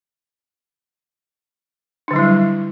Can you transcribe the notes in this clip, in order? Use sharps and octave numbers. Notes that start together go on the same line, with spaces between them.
D3 F#3 G3 D4 E4